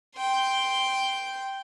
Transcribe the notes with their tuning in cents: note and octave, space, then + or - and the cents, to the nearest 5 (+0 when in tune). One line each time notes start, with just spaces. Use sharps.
G5 +0 C6 +0